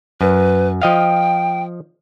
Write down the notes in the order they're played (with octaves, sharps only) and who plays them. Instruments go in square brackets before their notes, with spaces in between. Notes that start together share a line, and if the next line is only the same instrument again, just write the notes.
[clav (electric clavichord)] F#2 [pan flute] B4
[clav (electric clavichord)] F3 D#5 F5 [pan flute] G5